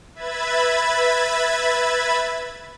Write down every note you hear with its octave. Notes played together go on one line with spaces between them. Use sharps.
B4 E5 B5 G#6 A6